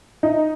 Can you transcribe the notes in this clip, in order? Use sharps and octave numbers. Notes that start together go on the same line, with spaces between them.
D#4